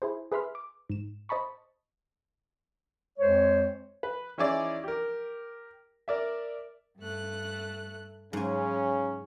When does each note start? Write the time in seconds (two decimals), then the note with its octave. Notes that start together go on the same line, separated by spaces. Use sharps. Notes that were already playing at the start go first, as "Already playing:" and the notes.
0.02 E4 G#4 C5
0.32 G#4 B4 E5 B5 C6 F6
0.55 D6
0.89 G#2 E7
1.29 C5 D#5 A5 B5 C#6
3.19 F2 G#3 C5 C#5
4.03 B4
4.38 E3 C#4 D#4 E4 G#4 D5
4.84 G4 A#4
6.08 A#4 D5 E5
6.98 G2 A3 F#6
8.33 G#2 C#3 F#3 C#4 G#5